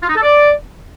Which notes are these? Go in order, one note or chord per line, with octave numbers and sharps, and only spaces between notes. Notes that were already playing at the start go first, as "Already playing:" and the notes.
F4
D#4
A4
D5